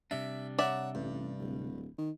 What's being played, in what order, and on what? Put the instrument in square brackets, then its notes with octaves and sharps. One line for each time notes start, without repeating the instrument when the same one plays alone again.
[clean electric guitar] C3 G3 D4 [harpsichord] E5
[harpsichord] C#5 F#5 A#5 [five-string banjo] D5 E5
[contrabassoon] A1 [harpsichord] G2
[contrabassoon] D1
D#3